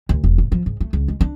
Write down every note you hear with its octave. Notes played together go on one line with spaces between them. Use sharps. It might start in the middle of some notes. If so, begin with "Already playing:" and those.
D2
E1
A2
F3
G#2
A3
C#2
G#3
D4